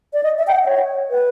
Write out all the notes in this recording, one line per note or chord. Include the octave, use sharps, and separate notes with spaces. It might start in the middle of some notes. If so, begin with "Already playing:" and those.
D5
D#5
E5
G5
F#5
C#5
B4